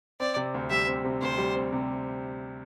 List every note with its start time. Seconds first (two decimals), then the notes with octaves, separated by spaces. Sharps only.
0.20 C4 D5
0.36 C3
0.54 D2
0.70 G3 E5
0.87 C4
1.04 C3
1.22 D2 C5
1.38 G3
1.55 C4
1.72 C3